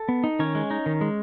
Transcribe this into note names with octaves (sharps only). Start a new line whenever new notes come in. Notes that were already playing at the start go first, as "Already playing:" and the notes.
Already playing: A4
B3
D#4
D#3 C#4 C#5
G#3
D#4
D#3
G#3